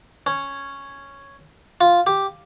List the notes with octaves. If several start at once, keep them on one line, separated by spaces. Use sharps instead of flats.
C#4
F4
G4